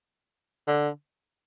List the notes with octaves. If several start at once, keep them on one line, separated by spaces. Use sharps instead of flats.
D3